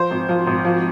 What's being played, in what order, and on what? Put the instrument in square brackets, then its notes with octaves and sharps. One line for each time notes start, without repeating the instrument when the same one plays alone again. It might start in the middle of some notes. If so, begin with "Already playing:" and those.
Already playing: [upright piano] F3 C5
G#1
F3
G#1
F3